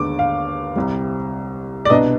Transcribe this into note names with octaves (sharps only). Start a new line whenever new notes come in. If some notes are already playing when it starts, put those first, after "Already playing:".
Already playing: D#2 D3 G#3 B3 D6
F5
C2 C3 G3
D5
C2 B2 B3 D4 D#5